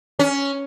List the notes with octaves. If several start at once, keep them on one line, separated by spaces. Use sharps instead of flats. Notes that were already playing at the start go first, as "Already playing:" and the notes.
C#4